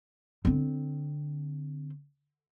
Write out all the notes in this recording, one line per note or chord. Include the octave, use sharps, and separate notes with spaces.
D3 C4